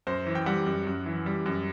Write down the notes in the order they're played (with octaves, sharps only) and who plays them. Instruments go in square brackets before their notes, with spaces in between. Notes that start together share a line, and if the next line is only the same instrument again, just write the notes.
[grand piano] F#2 C5
E3
G5
G3 F#5
F#2
F#2
E3
G3
F#2